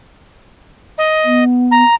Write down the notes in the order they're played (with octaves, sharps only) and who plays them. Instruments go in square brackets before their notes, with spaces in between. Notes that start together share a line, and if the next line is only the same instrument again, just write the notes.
[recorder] D#5
[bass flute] B3
[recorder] A#5